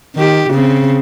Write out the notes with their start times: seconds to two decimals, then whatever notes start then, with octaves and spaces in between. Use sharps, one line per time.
0.16 D#3 G4
0.50 C#3 C4